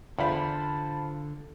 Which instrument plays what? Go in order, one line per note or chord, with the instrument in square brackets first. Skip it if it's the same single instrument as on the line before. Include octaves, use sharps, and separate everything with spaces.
[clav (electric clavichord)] E2 [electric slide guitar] D3 [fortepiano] F4 C5 B5 [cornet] A5